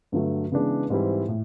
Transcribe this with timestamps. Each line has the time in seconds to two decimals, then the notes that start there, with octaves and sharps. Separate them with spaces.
0.12 G2 D3 F#3 A3
0.52 C#3 E3 G#3 B3 D4
0.90 G#2 E3 G3 C4 E4
1.28 A2